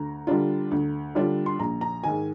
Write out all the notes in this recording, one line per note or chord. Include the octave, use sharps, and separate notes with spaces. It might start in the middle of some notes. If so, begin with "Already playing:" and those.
Already playing: D2 A#5
D3 G3 D4 F4
D2
D3 G3 D4 F4
C6
A#1 A#5
A#5
G#2 D#3 G#5